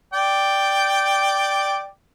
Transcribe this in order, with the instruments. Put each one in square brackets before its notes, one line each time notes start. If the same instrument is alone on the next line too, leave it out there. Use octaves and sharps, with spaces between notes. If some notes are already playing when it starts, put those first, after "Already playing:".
[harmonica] D5 G5